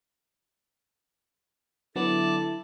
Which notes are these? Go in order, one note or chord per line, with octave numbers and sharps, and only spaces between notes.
D3 F#3 B3 E4 A4 D5 A5 D6